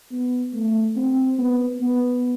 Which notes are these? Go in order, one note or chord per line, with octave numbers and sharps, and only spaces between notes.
B3
A3
C4
B3
B3